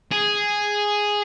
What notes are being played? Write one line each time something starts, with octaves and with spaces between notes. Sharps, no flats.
G#4